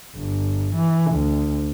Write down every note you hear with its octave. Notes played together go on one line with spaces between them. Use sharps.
G1
E3
D2